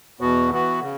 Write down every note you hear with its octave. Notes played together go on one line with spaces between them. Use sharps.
E2 B2 B3 F#4
E3 B3 F#4
C#3